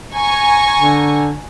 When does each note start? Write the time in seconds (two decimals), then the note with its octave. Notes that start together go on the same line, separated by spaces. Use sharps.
0.13 G#5 A#5 C#6
0.77 D3